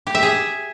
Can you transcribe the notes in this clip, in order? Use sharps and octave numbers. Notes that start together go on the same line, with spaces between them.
G4
E5
G#4